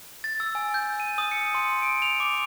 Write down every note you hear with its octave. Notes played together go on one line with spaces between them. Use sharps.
A6
E6
G#5
G6
D#7
D#6
C#7
C6
D7
F7
D6